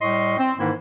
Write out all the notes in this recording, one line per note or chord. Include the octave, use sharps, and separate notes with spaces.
A2 G3 D#5 C6 C#6
C4
G#2 D#3 E3 A#3 E4